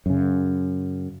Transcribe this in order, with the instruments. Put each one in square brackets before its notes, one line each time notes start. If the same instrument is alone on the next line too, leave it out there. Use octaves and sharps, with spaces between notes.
[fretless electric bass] F#2 C#3